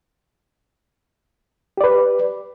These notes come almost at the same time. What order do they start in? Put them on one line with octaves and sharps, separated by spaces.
G4 D5 B4